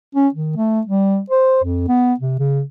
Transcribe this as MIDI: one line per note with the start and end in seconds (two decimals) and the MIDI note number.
0.15 0.28 61
0.34 0.56 51
0.57 0.81 57
0.87 1.19 55
1.30 1.61 72
1.64 1.85 41
1.88 2.14 59
2.20 2.37 48
2.39 2.62 49